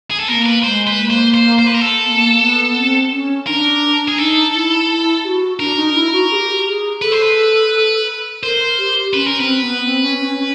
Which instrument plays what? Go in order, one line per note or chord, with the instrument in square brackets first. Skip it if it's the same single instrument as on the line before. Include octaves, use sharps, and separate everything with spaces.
[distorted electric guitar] G#4
A4
[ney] A#3 B3 [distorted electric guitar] A#4
[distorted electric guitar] B4
[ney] A3 [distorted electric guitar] C5
[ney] G#3
[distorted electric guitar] B4
[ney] A#3
[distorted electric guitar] C5
C5
C5
B4
A#4
A4
[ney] B3
A#3
B3
C4
C#4
[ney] D#4 [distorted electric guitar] A#4
[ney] D4
[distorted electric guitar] G#4
[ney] D#4 [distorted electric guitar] A4
[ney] E4
E4
G4
F#4
[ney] D4 [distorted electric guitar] A#4
[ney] D#4
E4
F#4
G#4
G4
G#4
[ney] A4 [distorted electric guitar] B4
[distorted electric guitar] C5
B4
[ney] A#4 [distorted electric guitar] C5
[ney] G4
[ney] C#4 [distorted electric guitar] B4
[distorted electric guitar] A#4
[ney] C4 [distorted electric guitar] B4
[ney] B3
C4
C#4
C#4
C#4